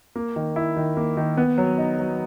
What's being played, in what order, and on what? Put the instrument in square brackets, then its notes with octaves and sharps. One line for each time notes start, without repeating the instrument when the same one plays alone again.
[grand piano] A#3
D#3
E4
D#3
A#3
D#3
B3
F#3
D#4
F#3